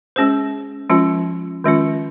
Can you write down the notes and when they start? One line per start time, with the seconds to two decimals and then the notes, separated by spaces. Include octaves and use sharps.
0.16 G#3 C#4 G#4 C5
0.89 F3 G#3 C#4 F4
1.64 D#3 G#3 C#4 F4